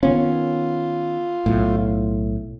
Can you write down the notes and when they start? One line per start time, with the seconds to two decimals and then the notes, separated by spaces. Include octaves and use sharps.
0.03 D#3 B3 C#4 F4
1.46 B1 A2